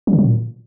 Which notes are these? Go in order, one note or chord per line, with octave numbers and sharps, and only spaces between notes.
F#3
D3
F#3
A#2